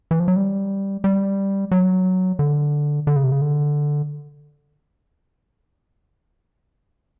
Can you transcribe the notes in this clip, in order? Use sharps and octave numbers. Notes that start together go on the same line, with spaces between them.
E3
F3
F#3
G3
G3
F#3
D3
D3
C#3
C3
C#3
D3